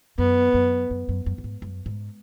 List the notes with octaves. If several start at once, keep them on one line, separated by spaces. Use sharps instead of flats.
F#2 B3
F#2
F#2
F#2
F#2
F#2
G#2
F#2
G#2